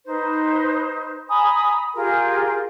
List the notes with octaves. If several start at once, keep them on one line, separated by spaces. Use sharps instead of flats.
D#4 B4 C5
G#5 A#5 B5 D#6
F4 G4 G#4 A#4